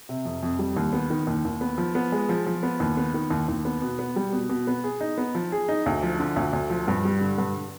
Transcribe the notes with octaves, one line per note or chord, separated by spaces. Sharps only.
C3
F2
F2
G3
D#2
B3
D#3
D#2
D#2
B3
F3
B3
G#3
F3
F3
B3
D#2
B3
D#3
D#2
D#2
B3
B2
B3
G3
B2
B2
B3
G#4
D#4
B3
F3
G#4
D#4
D2
F3
D3
D2
D2
F3
G2
G3
D3
G2